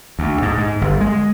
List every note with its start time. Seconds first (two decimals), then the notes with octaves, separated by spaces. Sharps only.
0.19 D2
0.42 G#2
0.58 G#2
0.81 G1
1.01 G#3